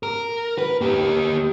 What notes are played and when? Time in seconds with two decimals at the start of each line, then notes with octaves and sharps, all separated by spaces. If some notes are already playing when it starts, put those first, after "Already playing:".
0.03 A#4
0.58 B4
0.81 A#3 G4